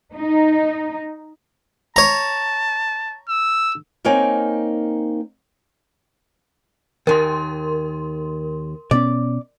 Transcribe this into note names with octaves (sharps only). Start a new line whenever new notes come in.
D#4
C#5 A5 A#5
E6
A#3 C4 D#4 A#4 C#5 G#5
D#2 D#3 A#4 C6
B2 B3 C#4 D5